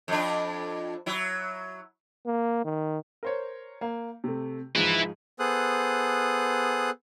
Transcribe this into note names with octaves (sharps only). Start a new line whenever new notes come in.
F2 D4
F#3 E4
A#3
D#3
A#4 C5 C#5
A#3
C3 A3
G#2 F3 G#3 E4 B4
B3 G#4 A4 C5 D#6 F#6